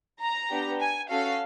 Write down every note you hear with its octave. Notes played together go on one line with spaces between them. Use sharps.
A#5
B3 D4 G4
G#5
C#4 F#4 A4 F5